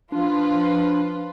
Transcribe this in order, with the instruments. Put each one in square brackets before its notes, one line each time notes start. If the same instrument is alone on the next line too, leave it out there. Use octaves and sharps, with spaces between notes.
[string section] F3 F4 B4 [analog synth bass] D4